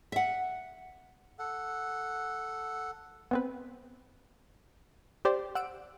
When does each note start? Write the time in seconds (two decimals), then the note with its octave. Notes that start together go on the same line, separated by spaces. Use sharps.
0.12 E5 F#5
1.39 A4 F#5
3.31 B3 C4 B4
5.25 G4 C5 D5
5.55 F#5 E6 D7